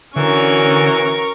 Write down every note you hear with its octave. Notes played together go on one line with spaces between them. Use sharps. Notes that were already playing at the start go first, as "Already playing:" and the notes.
D3 E3 C#4 F#4 A#4 C#6